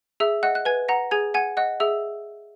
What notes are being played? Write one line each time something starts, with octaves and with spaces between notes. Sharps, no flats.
G#4 E5 E6
D#5 F#5 F#6
F#6
B4 G#5 G#6
F#5 A#5 A#6
G#4 G#5 G#6
F#5 G#5 G#6
D#5 F#5 F#6
G#4 E5 E6